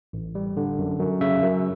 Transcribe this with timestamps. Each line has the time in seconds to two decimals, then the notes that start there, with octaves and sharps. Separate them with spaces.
0.13 A1
0.35 G3
0.57 D3
0.79 F#2
0.99 F#2
1.21 C#3 E5
1.42 F#2